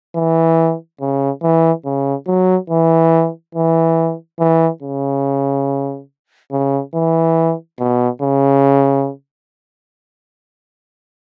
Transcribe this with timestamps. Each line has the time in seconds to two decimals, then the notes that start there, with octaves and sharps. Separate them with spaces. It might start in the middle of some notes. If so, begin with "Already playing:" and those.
0.15 E3
1.01 C#3
1.43 E3
1.85 C#3
2.27 F#3
2.70 E3
3.55 E3
4.40 E3
4.82 C#3
6.52 C#3
6.94 E3
7.79 B2
8.22 C#3